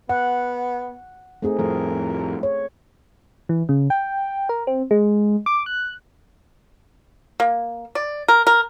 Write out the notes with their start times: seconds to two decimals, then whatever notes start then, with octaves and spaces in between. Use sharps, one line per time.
0.09 B3 F#5
1.42 A3 C4 D#4 G#4
1.59 F2 A2 A#4
2.43 C#5
3.49 E3
3.69 C#3
3.90 G5
4.49 A#4
4.67 C4
4.91 G#3
5.46 D6
5.66 F#6
7.40 A#3
7.95 D5
8.28 A#4
8.47 A#4